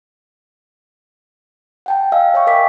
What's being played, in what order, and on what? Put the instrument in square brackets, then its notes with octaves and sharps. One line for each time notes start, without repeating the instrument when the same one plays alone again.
[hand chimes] F#5 G5 A5
D#5 F5 G#5 E6
C#5 E5 G5 G#5 C#6
A#4 D#5 G5 D6 B6